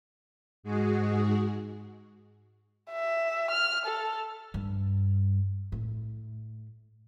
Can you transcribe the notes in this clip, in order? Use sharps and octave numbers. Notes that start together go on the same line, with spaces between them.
G#2 G#3 F#4 G#4
E5
F6
A4
G2
A2